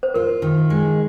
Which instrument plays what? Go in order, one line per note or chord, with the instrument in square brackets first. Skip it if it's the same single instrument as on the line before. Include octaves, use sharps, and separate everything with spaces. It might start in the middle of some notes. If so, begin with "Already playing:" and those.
[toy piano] C5
[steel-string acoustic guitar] F4 [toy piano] A#4
[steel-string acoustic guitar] D#3
G#3